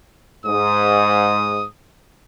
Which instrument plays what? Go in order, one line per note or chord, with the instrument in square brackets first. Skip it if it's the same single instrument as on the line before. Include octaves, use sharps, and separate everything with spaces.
[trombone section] G#2 [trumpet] D#6